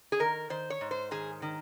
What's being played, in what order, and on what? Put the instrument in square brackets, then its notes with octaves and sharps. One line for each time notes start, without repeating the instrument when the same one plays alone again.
[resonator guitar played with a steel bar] G#4
D#3 A#4
D#3 C5
C#5
G#2
C5
D#3 G#4
D#3